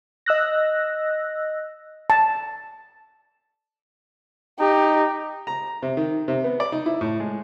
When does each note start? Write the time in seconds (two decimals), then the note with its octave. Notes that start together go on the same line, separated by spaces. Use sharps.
0.26 D#5 E6 F#6 A#6
2.10 A5
4.60 D#4 G4
5.47 A#5
5.83 C3
5.97 D#3
6.28 C3
6.44 B3
6.60 D5
6.72 D#4
6.86 E4
7.01 A2
7.20 G#3